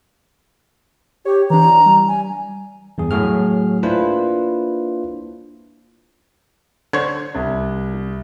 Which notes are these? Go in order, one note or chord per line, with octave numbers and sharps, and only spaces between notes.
G4 C#5
E3 D4 A#5
G3
G#5
E2 G2 G#4
A2 F#3 F#4 G#4 F6
A#3 D4 E4 F4 B4 C5
D3 C5 C#5 G#6
C2